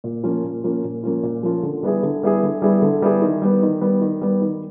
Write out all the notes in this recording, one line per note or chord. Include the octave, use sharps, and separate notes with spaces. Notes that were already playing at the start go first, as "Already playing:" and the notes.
A#2
F3 A#3 C#4 F4
A#2
F3 A#3 C#4 F4
A#2
F3 A#3 C#4 F4
A#2
F3 A#3 C#4 F4
D3
G3 B3 E4 G#4
D3
G3 B3 E4 G#4
D3
G3 B3 E4 G#4
D3
G3 B3 E4 G#4
D#3
G3 B3
D#3
G3 B3
D#3
G3 B3
D#3